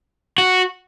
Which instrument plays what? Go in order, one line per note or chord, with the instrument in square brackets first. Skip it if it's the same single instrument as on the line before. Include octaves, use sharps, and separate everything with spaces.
[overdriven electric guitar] F#4